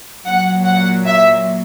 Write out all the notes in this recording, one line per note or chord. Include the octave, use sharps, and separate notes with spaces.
A#2 F#3 F#5
F#5
E5